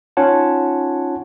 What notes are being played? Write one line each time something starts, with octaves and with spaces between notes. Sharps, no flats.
C#4 D#4 F4 C#5 F#5 A5